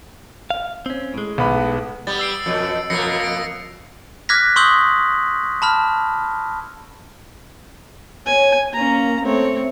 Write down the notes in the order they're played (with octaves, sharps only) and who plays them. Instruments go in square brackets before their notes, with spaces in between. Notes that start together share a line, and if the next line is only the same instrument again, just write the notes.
[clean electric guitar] F5
C4 C#4
A2 G#3
[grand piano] B1 B3 B5
[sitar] G3 B3 [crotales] A6
[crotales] E6 C7 D7
[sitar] F2 B2
[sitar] F2 B2 A#3 [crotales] A#6 C7 C#7
[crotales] A#6 D7
[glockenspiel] D6 F6 F#6 G#6 A#6 B6
C6 C#6 D#6 E6 G6 F#7
A5 B5 F6
[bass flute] C#5 [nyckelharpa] G#5
[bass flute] A#3 [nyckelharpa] C#4 A#5
[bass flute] A3 [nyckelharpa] C4 C#5